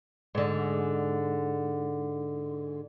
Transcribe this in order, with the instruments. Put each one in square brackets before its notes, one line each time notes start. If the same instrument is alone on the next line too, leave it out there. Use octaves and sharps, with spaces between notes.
[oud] G#2 D3